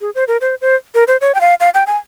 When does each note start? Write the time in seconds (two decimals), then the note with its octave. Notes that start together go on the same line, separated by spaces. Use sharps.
0.01 G#4
0.15 C5
0.28 A#4
0.41 C5
0.61 C5
0.95 A#4
1.08 C5
1.21 C#5
1.35 G5
1.41 F5
1.60 F5
1.75 G5
1.87 G#5